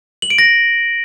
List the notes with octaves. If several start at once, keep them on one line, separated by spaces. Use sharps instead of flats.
F#7
D7
A#6